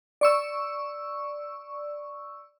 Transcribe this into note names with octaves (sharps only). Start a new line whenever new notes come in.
D5 C#6 E6